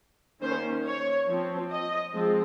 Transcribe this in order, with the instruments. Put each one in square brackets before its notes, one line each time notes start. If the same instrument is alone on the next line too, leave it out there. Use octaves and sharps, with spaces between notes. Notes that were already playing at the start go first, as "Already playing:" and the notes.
[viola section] D#3 A#3 C#4 C5
C#5
F3 C4
D#5
F3 G#3 C4